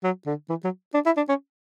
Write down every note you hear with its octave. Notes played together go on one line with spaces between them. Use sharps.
F#3
D3
E3
F#3
D4
E4
D4
C#4